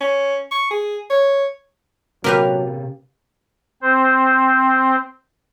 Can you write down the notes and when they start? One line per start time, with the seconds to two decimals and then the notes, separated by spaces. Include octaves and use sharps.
0.01 C#4
0.51 C#6
0.70 G#4
1.10 C#5
2.24 C3 F#3 A#3 C#4 G4 A#4 B4 F5
3.82 C4 C5